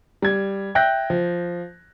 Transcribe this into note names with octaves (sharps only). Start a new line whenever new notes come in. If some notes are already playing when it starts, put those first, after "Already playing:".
G3 G#6
E5 G5 F#6 G6 A#6
F3